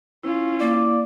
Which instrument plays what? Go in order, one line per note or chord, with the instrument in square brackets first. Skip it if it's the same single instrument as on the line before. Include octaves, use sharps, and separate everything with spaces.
[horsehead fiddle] C#4 F4 [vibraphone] E4
[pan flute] A#3 [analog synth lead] D5